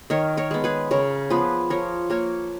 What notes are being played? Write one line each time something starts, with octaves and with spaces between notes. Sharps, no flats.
D#3 A#4 C#5
A#4 C#5
G#3 B3
G#4 B4
C#3 A#4 C#5
F3 B3 G#4 B4
F3 A#4 C#5
A#3 A#4 C#5